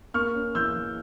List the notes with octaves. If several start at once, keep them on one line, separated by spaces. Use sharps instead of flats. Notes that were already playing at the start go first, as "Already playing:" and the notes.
A#3 C#6 F6
C#4
E3 E6 G6
E3